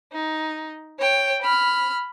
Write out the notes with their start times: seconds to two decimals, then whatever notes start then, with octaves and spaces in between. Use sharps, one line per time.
0.12 D#4
0.99 C#5 G5
1.42 B5 F6